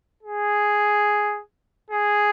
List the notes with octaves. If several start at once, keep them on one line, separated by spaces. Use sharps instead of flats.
G#4
G#4